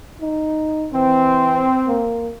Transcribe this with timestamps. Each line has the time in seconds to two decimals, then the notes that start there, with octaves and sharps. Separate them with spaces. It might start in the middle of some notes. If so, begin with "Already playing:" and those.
0.21 D#4
0.94 E3 C4
1.88 A#3